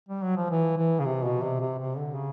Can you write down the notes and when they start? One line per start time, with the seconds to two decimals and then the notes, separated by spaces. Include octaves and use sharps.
0.09 G3
0.22 F#3
0.36 F3
0.50 E3
0.77 E3
1.00 C#3
1.05 C3
1.24 B2
1.43 C3
1.61 C3
1.79 C3
1.97 D3
2.15 C#3